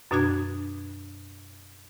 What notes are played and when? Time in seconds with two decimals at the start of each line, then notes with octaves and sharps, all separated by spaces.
0.11 F#2 B2 D4 F#4 G#6